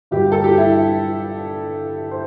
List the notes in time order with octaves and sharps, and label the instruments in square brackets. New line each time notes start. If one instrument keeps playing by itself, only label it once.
[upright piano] G1 G2 D3 G3 G4
A4
G4
E4
C5